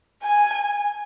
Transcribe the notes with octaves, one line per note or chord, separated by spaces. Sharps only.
G#5